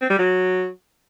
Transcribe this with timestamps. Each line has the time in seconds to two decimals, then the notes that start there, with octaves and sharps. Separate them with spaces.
0.01 C4
0.10 G3
0.19 F#3